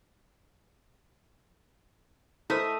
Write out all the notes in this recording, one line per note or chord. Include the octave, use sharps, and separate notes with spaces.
A3 E4 A#4 C5 D#5 E5